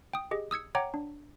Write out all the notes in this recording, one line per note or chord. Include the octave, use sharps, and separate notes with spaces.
G5 D#6
G4 G#4 D#5
D#6 E6 G#6 C#7
C#5 F#5 G5 A#5 D6
D4